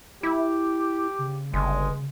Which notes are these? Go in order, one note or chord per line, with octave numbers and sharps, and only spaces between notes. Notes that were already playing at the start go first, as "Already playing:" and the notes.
E4 G4
C#3
G1 G#3